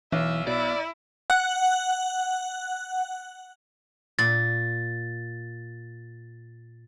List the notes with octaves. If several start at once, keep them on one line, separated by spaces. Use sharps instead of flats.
B1 E3 E5
B2 E4 D5
F#5 F#6
A#2 A6